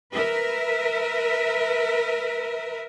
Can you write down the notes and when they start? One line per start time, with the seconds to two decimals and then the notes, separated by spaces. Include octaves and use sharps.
0.13 A#4 B4 E5